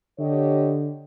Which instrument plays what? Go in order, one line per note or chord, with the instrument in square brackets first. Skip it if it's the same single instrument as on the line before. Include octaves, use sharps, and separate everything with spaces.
[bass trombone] D3 [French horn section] G4 C#5 D#5